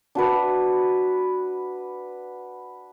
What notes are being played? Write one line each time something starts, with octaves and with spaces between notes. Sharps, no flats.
D4 F#4 B4